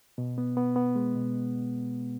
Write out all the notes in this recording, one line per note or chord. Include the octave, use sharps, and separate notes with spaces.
B2
B3
B3
B3
G#3
B2